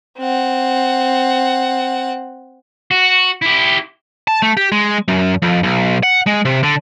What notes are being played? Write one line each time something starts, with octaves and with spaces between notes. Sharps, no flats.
C4 F#5
F#4
E4 G4
A5
A3
G4
G#3
F#2
F2
B1
F#5
G#3
C3
D3